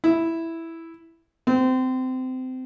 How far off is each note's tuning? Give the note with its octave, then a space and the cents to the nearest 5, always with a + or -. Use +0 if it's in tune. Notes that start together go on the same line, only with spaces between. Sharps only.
E4 +0
C4 -25